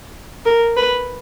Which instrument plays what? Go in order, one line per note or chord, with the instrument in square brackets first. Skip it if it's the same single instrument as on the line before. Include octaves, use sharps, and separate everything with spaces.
[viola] A#4
B4